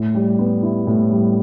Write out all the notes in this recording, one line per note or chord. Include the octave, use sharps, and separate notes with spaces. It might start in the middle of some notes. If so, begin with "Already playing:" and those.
Already playing: A2
G3
B3
E4
A2
G3